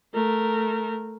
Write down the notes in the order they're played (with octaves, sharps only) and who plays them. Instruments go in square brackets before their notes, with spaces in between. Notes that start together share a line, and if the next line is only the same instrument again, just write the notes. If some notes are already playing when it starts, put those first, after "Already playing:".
[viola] A3 A#4